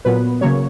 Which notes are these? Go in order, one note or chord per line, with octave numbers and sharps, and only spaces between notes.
A#2 F#3 B3 B4
C#3 F#3 A#3 C#5